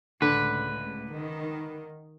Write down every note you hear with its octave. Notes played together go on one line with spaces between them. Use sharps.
C#2 A2 D3 B4
D#3